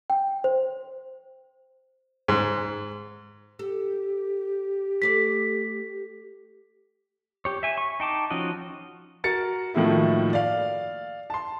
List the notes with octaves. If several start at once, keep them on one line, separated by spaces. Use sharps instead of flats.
G5
C5
G#2
G4 A4
A3 A4 D5 B6
G4 C#5
E5 G#5
C#6
D#4 G5 A5 D6
F3 C#4 D#4 F#4 D#5
F#4 A#4 A6 C#7
A2 D#3 F3 A#3 E4 F#4
D5 F5
A5 C6